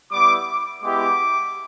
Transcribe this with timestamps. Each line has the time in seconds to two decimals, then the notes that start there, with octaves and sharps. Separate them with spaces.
0.12 G3 B3 E4 D6
0.82 G#3 B3 E4 G4 D6